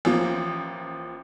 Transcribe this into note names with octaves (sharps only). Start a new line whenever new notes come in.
A1 F3 A#3